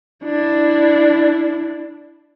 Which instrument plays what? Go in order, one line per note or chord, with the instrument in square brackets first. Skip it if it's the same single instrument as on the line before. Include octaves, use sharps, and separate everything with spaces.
[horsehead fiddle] D4 E4